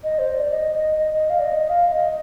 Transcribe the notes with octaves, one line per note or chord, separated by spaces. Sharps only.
D#5
C5
D5
D#5
D#5
D#5
D#5
F5
D5
D#5
F5
D#5